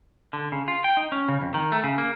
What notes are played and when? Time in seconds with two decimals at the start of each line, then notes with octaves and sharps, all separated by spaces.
0.33 D3
0.52 C#3
0.68 F4
0.84 G5
0.97 D#4
1.12 C#4
1.29 C#3
1.42 F2
1.54 D#3
1.72 A3
1.84 C#3
1.98 A#3